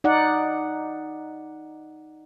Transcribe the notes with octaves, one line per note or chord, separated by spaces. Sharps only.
D#4 D5 F#5